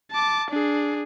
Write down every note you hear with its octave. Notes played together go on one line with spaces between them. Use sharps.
A5 D6
D4 G#4